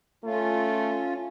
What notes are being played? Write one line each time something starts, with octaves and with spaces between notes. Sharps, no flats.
A3 C#4 F4